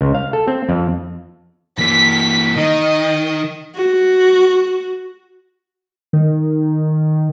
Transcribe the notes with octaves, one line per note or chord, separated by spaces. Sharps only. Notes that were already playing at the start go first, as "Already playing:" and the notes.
C#2
F5
A4
C4
F2
E3 A#3 B6
D#3 D#5
F#4
D#3